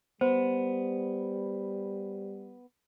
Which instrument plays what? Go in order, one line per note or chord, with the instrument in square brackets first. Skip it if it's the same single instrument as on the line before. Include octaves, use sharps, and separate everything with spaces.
[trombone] G3 [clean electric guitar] B3 [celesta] C5